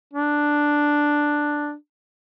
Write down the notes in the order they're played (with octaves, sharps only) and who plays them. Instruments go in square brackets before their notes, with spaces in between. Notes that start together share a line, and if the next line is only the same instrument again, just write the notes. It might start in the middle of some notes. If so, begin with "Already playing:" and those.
[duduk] D4